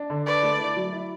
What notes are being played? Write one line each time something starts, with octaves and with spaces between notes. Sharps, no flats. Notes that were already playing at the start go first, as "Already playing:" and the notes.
Already playing: D4
D3
B4 D5
A3
E4
F#3
E4